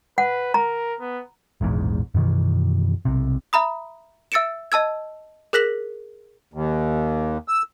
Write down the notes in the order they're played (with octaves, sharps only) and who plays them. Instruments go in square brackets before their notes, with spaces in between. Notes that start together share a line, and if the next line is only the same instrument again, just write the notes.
[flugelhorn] B4 [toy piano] F#5
[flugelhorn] A#4 [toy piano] A#5
[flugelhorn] B3
[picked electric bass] E1 A#1 E2 G#2
F#2 B2 D#3 E3
B1 C3
[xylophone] E5 A#5 B5 D#6
E5 E6 A6 C#7 D7 E7
D#5 A5 E6 G#6
G#4 A#4 F#6 A#6 B6 F#7
[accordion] D#2
E6